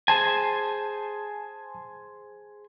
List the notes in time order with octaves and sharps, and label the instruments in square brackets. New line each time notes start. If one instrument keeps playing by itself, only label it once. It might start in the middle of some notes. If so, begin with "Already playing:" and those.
[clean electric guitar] G#4 C5 G#5 [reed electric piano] A5